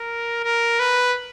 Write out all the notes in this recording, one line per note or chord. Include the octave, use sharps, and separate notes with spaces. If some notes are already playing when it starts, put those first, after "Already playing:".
Already playing: A#4
A#4
B4